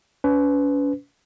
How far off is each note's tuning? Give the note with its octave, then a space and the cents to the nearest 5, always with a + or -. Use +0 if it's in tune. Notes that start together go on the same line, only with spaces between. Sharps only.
C#4 +40 B4 +20